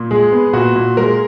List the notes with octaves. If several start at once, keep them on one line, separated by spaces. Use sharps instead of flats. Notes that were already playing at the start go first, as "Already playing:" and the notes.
Already playing: A#2
G#3 G#4
B3
A#2 F#4
A#2
G#3 A#4